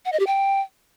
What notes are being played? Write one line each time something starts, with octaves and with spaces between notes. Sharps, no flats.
F#5
D#5
G4
G5